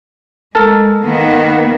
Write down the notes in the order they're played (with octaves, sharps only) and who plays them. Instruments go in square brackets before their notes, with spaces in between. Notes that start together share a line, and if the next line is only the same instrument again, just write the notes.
[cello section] G#3 [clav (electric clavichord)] A4 A#4 A5
[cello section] D#3 A#3 B3